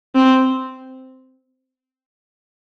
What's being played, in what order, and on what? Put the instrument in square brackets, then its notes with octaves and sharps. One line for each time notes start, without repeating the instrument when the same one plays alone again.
[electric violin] C4